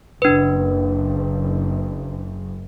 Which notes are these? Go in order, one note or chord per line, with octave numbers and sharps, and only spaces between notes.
F#1 D4 B4